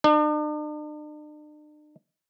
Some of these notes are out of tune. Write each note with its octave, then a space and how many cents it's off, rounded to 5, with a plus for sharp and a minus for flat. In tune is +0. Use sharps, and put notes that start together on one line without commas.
D4 +45